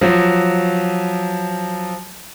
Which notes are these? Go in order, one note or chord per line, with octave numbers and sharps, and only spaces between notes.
F3 F#3